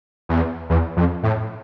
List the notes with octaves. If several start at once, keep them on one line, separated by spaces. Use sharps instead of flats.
E2
E2
F2
A2